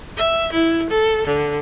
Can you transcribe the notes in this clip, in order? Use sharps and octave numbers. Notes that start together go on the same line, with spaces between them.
E5
E4
A4
D3